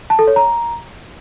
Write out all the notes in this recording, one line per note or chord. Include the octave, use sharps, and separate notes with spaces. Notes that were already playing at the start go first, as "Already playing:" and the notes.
A5
A4
C#5
A#5